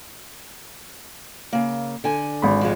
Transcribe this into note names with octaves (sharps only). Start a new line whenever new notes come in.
C#3 A#3
D3 G#5
G#1 B5
F2 F3 G#3